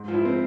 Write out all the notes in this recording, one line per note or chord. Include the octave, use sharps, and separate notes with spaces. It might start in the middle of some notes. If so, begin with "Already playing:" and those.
Already playing: G#2
F3
E4
C4